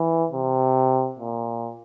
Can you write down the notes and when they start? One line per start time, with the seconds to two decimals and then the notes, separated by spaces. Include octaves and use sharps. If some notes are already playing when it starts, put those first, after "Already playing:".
Already playing: E3
0.32 C3
1.19 A#2